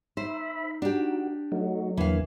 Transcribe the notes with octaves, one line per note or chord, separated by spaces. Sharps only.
D#4 C5 E5 B5
D4 F#4 G4
F#3 A3 D#4 F#4
E2 D3 E3 A#3 F5